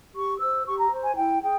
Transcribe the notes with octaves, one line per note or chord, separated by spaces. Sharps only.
G4 C#6
C5 E6
G4 C#6
A#5
C5
G#5
E4 G5
G#4 G5